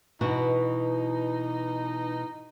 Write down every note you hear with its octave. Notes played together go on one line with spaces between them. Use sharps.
B2 E3 D#4 F#4